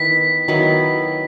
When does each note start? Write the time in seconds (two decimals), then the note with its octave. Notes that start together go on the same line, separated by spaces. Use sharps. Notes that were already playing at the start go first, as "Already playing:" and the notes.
Already playing: D#3 B3 E4 B6
0.48 D#3 F#3 B3 E4